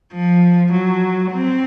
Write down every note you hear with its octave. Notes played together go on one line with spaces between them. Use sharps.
F3
F#3
C4